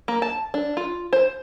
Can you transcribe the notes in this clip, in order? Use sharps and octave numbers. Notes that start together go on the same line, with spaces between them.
A#3
A5
D4
F4
C5